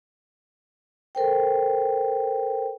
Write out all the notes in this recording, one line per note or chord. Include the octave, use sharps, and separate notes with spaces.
A4 A#4 C5 G5